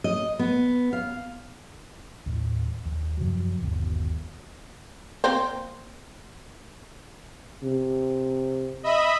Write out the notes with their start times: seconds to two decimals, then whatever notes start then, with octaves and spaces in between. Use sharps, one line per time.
0.04 D#5
0.39 B3
0.93 F5
2.26 D#2 A2
2.85 D#2
3.17 F#2 C3 F3 F#3
3.61 G1 D#2 B2
5.24 A#3 C4 C5
7.63 C3
8.83 D#5 E5 B5